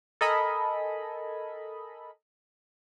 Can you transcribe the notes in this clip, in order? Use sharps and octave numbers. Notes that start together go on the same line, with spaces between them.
A4 A#4 D#5 G#5 B5